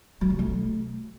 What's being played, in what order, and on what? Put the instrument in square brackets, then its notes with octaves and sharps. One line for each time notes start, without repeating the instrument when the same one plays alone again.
[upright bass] F#3
C3
A3